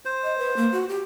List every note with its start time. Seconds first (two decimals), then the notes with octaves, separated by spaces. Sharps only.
0.05 C5
0.23 D#5
0.38 B4
0.57 A#3
0.72 F#4
0.89 G4